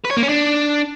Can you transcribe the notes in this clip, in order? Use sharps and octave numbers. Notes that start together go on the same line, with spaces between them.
B4
C#5
A#3
C#4
D4